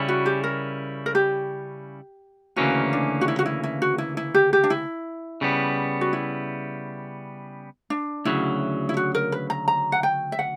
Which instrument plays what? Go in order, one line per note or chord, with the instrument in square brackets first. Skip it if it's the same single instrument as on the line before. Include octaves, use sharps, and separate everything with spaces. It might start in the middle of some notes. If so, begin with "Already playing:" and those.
Already playing: [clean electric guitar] C#3 G3 C#4 E4
[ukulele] F#4
G4
A#4
A#4
G4
[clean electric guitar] D2 C#3 E3 A#3 C#4 [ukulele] F#4
[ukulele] D4
F#4
E4
F#4
E4
E4
F#4
E4
E4
G4
G4
D4
E4
[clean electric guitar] C#3 G3 B3
[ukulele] F#4
E4
D4
[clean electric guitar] D2 C#3 F#3 [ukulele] E4
[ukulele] E4
F#4
A#4
B4
A#5
A#5
F#5
G5
E5
F#5